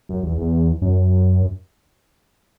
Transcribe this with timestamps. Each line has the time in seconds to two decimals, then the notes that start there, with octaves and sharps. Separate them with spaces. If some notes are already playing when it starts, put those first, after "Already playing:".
0.09 F#2
0.23 E2
0.38 E2
0.82 F#2